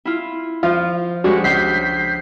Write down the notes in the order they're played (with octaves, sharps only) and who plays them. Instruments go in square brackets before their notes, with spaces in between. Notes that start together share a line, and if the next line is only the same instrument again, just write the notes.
[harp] E4 F4
[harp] F3 [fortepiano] F4
[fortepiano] G3 G#3 [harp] D4 C#5 [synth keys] F#4
[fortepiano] C#2 [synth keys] G6 B6 C7